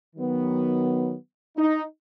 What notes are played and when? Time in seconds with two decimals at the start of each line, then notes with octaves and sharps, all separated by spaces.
0.16 D#3 F#3 B3
1.57 D#4